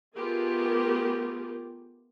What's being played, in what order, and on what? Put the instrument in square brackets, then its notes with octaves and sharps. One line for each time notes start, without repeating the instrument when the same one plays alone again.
[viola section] A3 B3 F4 G4 G#4 A#4